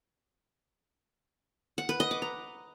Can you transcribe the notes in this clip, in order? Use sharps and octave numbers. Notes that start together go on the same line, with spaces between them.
F#5
B4
D#5
D6
A#5